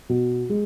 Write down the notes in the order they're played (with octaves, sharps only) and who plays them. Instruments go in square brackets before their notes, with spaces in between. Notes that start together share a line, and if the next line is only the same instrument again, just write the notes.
[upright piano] B2
G#3